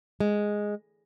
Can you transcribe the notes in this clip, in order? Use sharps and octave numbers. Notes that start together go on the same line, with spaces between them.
G#3